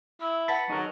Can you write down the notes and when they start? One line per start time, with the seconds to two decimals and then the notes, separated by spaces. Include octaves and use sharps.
0.21 E4 E6
0.48 B4 F#5 A5 B5 A6
0.70 F#3 D#4 G#4 A#4